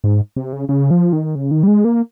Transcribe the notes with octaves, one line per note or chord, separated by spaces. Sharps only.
G#2
C3
C#3
C#3
F3
D#3
C#3
D#3
G3
G#3
A#3